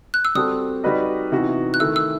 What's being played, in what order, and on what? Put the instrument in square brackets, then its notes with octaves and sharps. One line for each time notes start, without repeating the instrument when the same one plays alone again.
[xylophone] F#6
E6
[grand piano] G3 C4 F#4 A4 [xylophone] D#6
[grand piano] G3 D#4 F#4 B4 D#5
C3 E3 B3 D#4 F#4
[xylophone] F#6
[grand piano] D#3 A3 E4 [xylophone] E6
[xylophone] E6